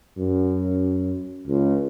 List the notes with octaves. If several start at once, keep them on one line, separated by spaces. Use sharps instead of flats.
F#2
C#2